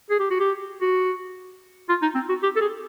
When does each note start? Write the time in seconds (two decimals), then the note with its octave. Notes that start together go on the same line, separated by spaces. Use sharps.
0.10 G#4
0.20 G4
0.31 F#4
0.40 G4
0.81 F#4
1.89 F4
2.02 D#4
2.15 C4
2.29 F#4
2.43 G4
2.56 A4
2.61 G#4